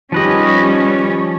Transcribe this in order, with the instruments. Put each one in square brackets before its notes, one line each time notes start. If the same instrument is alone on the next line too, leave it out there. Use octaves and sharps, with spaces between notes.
[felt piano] D#3 G4 [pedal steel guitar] F3 B4 D#5 [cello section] G3 C#4